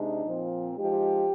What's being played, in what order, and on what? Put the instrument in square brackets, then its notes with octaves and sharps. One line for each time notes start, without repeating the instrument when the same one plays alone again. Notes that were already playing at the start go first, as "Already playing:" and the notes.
Already playing: [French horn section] C3 G#3 D4 D#4
A#2 F3 C4
F3 G#3 D#4 G4